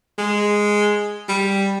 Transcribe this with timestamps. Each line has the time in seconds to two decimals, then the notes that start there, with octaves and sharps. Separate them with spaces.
0.18 G#3
1.29 G3